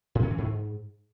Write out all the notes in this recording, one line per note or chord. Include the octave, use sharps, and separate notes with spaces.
A2
C#4
E3
G#2